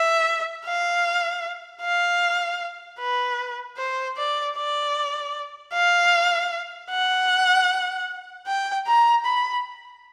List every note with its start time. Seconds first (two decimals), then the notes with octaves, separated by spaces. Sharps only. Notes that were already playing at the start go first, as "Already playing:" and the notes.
Already playing: E5
0.65 F5
1.81 F5
2.99 B4
3.77 C5
4.17 D5
4.57 D5
5.73 F5
6.91 F#5
8.47 G5
8.87 A#5
9.25 B5